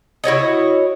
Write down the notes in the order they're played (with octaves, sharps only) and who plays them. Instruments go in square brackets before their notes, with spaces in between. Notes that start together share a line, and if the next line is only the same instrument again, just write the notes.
[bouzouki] E4 F#4 C#5 D#5